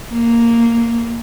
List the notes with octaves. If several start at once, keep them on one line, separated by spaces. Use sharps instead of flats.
A#3